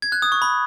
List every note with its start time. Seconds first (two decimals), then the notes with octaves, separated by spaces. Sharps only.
0.02 G#6
0.12 F#6
0.22 D#6
0.32 C#6
0.42 B5